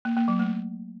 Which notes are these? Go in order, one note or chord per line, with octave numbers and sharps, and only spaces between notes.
A#3
A#3
F#3
A3